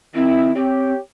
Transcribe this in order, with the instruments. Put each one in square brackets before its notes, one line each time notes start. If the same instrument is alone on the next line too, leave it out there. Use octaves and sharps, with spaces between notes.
[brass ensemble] D#3 E4 [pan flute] C4
[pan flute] C4 [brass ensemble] G4 C#5